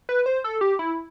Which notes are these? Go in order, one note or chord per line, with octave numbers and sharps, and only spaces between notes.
B4
C5
A4
G4
E4